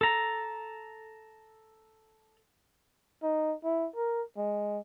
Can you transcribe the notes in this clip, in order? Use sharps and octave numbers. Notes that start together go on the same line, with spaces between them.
A4 A#5
D#4
E4
A#4
G#3